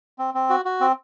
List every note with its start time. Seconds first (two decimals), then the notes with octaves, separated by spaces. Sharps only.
0.18 C4
0.34 C4
0.50 F#4
0.65 F#4
0.81 C4